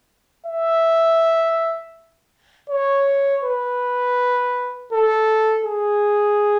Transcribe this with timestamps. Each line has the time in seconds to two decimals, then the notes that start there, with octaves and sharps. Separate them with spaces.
0.46 E5
2.70 C#5
3.44 B4
4.92 A4
5.66 G#4